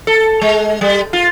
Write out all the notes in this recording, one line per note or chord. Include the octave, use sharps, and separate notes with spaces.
A4
G#3
G3
F4